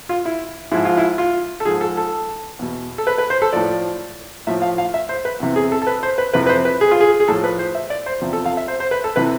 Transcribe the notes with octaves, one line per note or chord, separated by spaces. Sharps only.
F4
E4
G#2 F3 E4
F4
E4
F4
A4
G#2 F3 G#4
A4
A4
E2 B2
A4
B4
B4
C5
A4
A2 F3 D5
A2 F3 E5
F5
F5
E5
C5
B4
E2 C3 E3
G#4
A4
A4
B4
C5
B4
F2 C3 E3 B4
B4
C5
B4
G#4
F4
G#4
G#4
A2 F3 A4
B4
C5
E5
D5
C5
E2 C3 F3
A4
F5
E5
C5
C5
B4
A4
C3 E3 B4